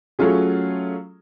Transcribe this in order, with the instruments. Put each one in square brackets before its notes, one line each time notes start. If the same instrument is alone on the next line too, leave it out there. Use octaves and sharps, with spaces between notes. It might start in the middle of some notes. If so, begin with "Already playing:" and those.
[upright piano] F#3 A3 C#4 F4 G#4